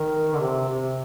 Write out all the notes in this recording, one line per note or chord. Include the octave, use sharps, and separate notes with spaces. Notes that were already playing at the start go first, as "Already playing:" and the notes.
Already playing: D#3
D3
C3
C3